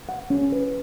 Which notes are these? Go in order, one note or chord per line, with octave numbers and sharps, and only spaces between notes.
F#5
C#4
B4